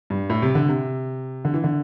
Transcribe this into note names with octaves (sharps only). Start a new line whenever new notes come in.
G2
A2
C3
D3
C3
D3
E3
D3